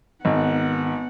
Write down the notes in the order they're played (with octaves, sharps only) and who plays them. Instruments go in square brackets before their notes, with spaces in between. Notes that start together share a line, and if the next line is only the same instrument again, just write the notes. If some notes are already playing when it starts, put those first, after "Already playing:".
[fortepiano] G#1 [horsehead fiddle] B3 F#5